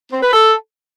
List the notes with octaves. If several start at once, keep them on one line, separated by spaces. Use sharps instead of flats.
C4
B4
A4